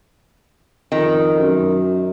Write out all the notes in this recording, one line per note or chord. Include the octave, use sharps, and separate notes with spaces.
F2 D#3
F#2